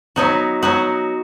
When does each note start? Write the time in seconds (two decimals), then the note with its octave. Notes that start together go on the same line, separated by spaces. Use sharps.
0.16 F#3 B3 D#4 F#4
0.62 F#3 B3 D#4 F#4